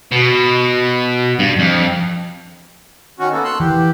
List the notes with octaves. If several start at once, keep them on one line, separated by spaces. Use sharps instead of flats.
B2
G2
F2
D#3 C#4 F#4
A#3 B3 A4
C6 E6 F#6
E3 G4